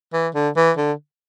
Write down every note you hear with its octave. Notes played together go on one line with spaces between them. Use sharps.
E3
D3
E3
D3